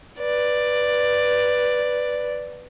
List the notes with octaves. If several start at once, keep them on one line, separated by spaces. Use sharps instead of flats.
B4 D5